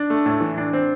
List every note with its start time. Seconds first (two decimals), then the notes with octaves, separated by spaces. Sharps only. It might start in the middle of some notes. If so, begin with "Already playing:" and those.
Already playing: D4
0.10 A3
0.26 A2
0.41 E3
0.58 D4
0.73 C4